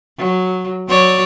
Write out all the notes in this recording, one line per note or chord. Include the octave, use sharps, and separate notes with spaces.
F#3
F#3 C#5 D5